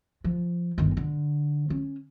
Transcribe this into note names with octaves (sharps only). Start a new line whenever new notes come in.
F3
G1 D#3
D3
C#4